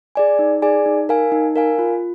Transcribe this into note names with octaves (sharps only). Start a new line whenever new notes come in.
G#4 D5 G#5
D#4
G#4 D5 G#5
D#4
A#4 F5 G#5
D#4
A#4 F5 G#5
F4